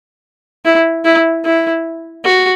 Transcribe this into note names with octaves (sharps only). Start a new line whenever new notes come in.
E4
E4
E4
F#4